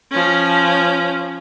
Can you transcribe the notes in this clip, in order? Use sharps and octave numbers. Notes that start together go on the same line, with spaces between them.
F3 C#4